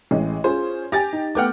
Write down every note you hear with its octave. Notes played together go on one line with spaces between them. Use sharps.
A1 G#3
C#4 F4 G#4 C5
G4 G#5 A6 A#6
D#4
A3 B3 F#5 G5 D6 F6